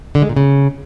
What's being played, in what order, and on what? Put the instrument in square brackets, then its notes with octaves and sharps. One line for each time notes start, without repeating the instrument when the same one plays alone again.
[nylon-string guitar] D3
G#3
A#2
C#3